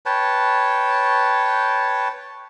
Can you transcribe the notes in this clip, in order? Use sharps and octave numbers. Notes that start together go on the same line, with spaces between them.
B4 C#5 G5 A5